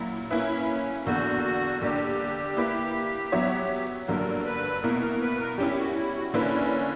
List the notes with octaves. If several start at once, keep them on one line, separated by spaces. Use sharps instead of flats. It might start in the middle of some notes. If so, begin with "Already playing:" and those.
Already playing: A#2 F#3 E4
A#3 C#4 E4 B4 E5
E2 D3 A#3 F#4
F#4
D3 G3 A#3 D4 G4
A#3 E4 B4 E5
F#3 B3 F#4 C#5 E5
G2 D3 F#3 A#3 A#4
B4
B2 A#3 E4 A#4
A#4
B4
A#4
G3 C#4 E4 G4
F#4
E4
F#4
D3 A#3 C#4 E4 B4